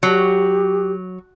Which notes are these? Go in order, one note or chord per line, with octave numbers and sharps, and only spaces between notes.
F#3 G4